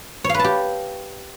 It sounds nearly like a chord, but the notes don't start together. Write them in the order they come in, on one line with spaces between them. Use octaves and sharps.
C#5 F5 B4 A5 G4